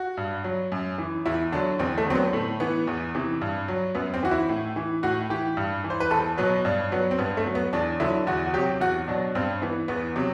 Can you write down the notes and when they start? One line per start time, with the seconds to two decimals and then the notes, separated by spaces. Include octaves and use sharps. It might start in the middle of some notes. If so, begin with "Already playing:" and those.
Already playing: F#4
0.17 G2
0.44 F#3
0.72 F#2
0.98 E3
1.25 E2 E4
1.52 D3 F#3 D4
1.79 E2 C4
1.98 A3
2.07 D3 F#3 C4
2.15 B3
2.33 A2 A3
2.60 E3 B3
2.87 E2
3.15 C3 E3
3.41 G2
3.68 F#3
3.95 F#2 B3
4.14 C4
4.23 E3 F#4
4.31 E4
4.49 A2
4.76 E3
5.03 A2 F#4
5.30 E3 G4
5.57 G2
5.84 E3
5.90 C5
6.00 B4
6.11 E2 A4
6.38 B2 F#3 B4
6.65 G2 D4
6.92 F#3 B3
7.11 C4
7.18 G2 B3
7.37 A3
7.46 F#3
7.55 B3
7.73 E2 D4
8.00 D3 F#3 E4
8.27 E2 F#4
8.46 F#4
8.54 F#3 G4
8.58 C3
8.81 E2 F#4
9.08 B2 F#3 D4
9.35 G2 C4
9.62 E3 B3
9.88 E2 B3
10.16 C3 F#3